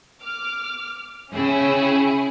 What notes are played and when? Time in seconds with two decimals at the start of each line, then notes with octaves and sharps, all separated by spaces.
0.22 D6 F6
1.33 C#3 C#4 E4 G#4 G5 E6